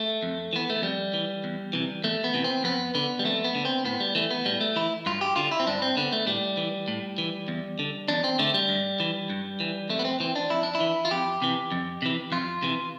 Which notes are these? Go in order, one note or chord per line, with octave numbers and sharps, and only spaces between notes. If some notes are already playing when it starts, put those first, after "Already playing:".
Already playing: A3
F2
E3 B3
A3
F2 G3
E3
E2
C3 E3
E2 A3
B3
C3 E3
C4
F2 B3
D3 B3
G3
F2 A3
B3
D3
C4
A2 B3
G3
E3 A3
B3
A2 G3
A3
E3 E4
G2 F4
G4
D3 F4
E4
C4
G2 D4
C4
D3 B3
A3
A2 G3
E3
A2
E3
E2
D3
E2 D4
C4
D3 A3
G3
G2
E3
G2
E3
F2 A3
B3
C4
E3 C4
D4
F2 E4
D4
E4
E3
F4
F2 G4
C3 E3
F2
C3 E3
F2 F4
C3 E3